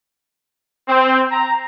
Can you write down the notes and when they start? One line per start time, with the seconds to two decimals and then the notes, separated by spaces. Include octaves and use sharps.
0.89 C4
1.32 A#5